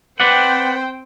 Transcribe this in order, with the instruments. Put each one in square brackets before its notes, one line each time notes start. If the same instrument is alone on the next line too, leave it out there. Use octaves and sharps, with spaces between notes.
[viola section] C4 C5 G5 [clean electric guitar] B4 D5 F#5